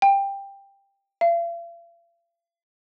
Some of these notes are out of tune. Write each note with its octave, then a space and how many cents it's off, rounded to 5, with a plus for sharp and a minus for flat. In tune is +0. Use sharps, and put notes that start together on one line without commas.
G5 +15
F5 -45